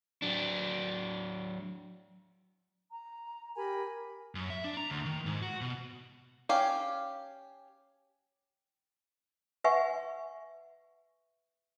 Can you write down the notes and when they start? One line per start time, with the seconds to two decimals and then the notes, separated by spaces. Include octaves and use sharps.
0.22 F#3 D4
2.91 A#5
3.57 G4 A#4 G#5 B5
4.35 F#2
4.50 E5
4.64 D4
4.77 A#5
4.90 D2
5.05 D#3
5.26 G#2
5.42 F#4
5.61 B2
6.49 C#4 G4 F5
9.64 B4 E5 F#5 G#5 C#6